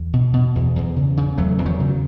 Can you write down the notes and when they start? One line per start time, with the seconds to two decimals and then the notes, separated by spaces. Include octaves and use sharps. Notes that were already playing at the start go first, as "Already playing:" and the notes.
Already playing: E2
0.13 B2
0.33 B2
0.55 E2
0.76 E2
0.96 C#3
1.17 C#3
1.38 E2 F#3 A3
1.58 E2
1.65 D#3 F#3
1.80 C#3